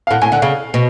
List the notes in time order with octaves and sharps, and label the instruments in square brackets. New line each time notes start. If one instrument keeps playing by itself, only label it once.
[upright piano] F5
[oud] A2 [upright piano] F#5
[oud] A2 [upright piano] G#5
[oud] D3 [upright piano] F#5
[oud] C#3 [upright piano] F5
[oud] B2